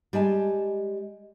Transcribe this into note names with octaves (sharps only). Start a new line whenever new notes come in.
G3 G#3 G#5 A5